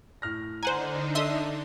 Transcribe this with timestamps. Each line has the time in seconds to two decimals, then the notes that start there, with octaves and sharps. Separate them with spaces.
0.22 A2 F6 A#6
0.63 D3 D4 D#4 C5 F#5 G#5 A#5
1.15 A4 D#5 E5 C6 D#6